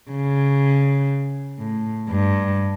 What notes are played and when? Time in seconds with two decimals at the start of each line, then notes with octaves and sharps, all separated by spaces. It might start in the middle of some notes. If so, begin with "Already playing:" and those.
0.11 C#3
1.59 A2
2.09 G2